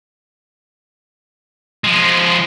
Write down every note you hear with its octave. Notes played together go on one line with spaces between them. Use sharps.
F3 G#3